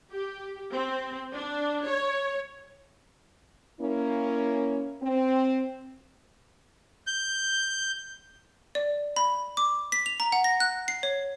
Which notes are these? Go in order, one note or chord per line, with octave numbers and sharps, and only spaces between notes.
G4
C4
D4
C#5
A#3 C#4 E4
C4
G6
D5
B5
D6
B6
F7
A#5
F#5
A#6
F#6
C7
C#5